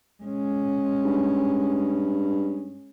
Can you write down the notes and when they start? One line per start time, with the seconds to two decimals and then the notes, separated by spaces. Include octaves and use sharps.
0.23 G#3 C#4
1.05 G2